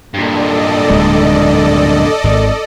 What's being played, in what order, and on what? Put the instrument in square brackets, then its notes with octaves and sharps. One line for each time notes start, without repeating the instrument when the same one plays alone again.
[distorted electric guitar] G2 A#2 [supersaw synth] A4 D5 D#5
[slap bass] D1 G#3
G#1 G#2 D#3